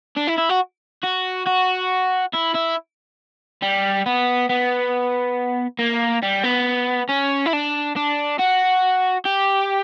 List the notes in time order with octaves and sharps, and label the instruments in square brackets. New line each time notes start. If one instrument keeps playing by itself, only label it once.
[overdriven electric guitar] D4
E4
E4
F#4
F#4
F#4
E4
E4
G3
B3
B3
A#3
G3
B3
C#4
E4
D4
D4
F#4
G4